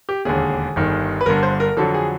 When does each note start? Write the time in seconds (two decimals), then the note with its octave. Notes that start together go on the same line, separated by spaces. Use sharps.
0.09 G4
0.25 E1 D#2 D3 G#4
0.76 G1 G2 D#3
1.21 B4
1.26 G1 G2 D3 A#4
1.43 C5
1.60 A#4
1.77 F2 D3 F#3 A4
1.94 G#4